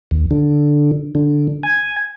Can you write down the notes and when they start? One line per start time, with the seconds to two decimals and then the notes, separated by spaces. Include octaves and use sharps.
0.11 D#2
0.31 D3
1.15 D3
1.63 G#5